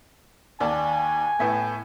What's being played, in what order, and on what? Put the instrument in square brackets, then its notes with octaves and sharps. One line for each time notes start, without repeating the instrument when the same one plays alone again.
[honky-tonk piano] D#2 D5 A5 [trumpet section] G#5
[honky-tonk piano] A2 A3 B3